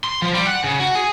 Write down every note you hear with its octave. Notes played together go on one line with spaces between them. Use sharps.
C6
F3
G3
F#5
C#3
F#4
G#4